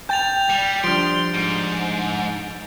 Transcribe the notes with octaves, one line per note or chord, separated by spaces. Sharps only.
G5 G6 A6 F7
G3
F3 G3 D4 C6 D7
G#2